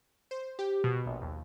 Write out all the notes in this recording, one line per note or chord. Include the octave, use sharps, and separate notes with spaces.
C5
G4
B2
A#1
D#2